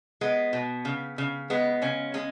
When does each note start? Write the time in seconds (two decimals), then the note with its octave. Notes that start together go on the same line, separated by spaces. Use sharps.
0.21 G#3 B3
0.53 B2
0.85 C#3
1.18 C#3
1.50 G#3 B3
1.82 C#3 C#4
2.14 G#3 C#4